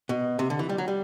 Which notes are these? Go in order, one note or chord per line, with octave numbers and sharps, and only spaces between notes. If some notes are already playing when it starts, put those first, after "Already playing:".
B2
C3
D3
E3
G3
F#3
G3